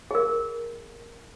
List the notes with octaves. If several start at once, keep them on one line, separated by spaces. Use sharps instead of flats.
G#4 A#4